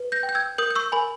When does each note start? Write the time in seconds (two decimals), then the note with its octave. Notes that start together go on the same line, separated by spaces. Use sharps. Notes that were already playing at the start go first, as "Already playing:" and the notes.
Already playing: B4
0.12 G6 A#6
0.23 G5
0.29 G6
0.35 E6 G#6
0.58 A#4 D#6 G6
0.71 G6
0.76 C#6 E6
0.92 A#4 G#5 B5